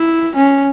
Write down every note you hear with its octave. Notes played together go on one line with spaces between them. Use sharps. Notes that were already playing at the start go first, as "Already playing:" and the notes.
Already playing: E4
C#4